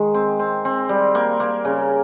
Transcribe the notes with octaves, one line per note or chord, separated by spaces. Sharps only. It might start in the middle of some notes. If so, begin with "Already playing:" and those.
Already playing: D#3 G#3
C4
C4
C4
G3
A#3
A#3
C#3